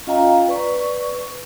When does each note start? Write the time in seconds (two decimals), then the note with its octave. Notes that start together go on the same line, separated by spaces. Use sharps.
0.07 C#4 F4 D#5 F5 G5 A#5
0.48 B4 D5 C#6